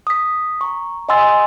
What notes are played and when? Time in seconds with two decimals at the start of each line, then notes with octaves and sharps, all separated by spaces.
0.07 D#6 B6
0.61 A#5 C#6
1.09 D#5 F#5 G#5 C6 E6 A6